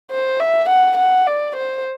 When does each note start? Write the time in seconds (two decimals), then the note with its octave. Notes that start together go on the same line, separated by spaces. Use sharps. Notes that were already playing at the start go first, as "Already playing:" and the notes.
0.11 C5
0.40 E5
0.69 F#5
0.97 F#5
1.27 D5
1.56 C5